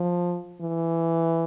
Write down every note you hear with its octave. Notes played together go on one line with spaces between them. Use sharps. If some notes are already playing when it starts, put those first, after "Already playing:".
Already playing: F3
E3